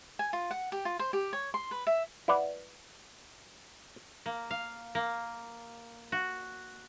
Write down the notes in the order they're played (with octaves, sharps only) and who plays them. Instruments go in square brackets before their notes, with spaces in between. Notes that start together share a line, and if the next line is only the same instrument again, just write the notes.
[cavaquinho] G#5
F4
F#5
G4
F4
C5
G4
C#5
C6
B4
E5
[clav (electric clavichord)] E4 B4 D5 F#5
[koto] A#3
F5
A#3
F#4